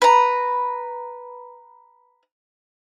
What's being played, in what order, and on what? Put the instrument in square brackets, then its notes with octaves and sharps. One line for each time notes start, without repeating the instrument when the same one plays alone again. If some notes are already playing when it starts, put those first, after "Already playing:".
[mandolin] B4 A#5